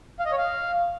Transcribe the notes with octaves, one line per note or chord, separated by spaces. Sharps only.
F5
D#5
C#5
F5